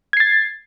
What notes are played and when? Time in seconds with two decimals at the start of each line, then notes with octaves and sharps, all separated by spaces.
0.13 G#6
0.17 C7
0.20 A6